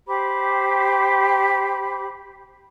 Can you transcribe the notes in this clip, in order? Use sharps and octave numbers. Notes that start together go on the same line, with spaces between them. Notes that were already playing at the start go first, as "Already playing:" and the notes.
G4 C5 B5 D6